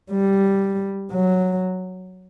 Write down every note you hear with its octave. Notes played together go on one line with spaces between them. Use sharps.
G3
F#3